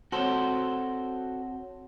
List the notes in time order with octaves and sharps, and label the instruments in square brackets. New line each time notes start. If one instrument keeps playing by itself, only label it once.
[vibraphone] C4 C#5 F#5 [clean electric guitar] F#4 A4 C5